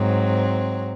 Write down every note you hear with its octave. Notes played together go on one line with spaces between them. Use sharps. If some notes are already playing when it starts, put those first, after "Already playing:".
Already playing: G#2 F#3 C4